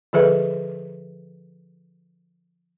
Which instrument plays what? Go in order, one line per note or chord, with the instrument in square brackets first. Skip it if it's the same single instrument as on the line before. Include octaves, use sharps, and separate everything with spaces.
[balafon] D3 F3 G#4 A4 B4 E5